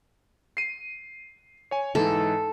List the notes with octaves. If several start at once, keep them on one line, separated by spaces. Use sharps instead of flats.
C7 D#7
C#5 G#5
G#2 E3 D#4 A4